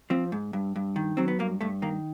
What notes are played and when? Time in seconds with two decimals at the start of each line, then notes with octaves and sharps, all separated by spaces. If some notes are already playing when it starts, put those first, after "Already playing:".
0.10 F3 C4
0.32 G#2
0.53 G2
0.76 G2
0.96 D#3
1.17 F#3 C4
1.28 B3
1.39 G2 A#3
1.61 G2 A3
1.82 D#3 A#3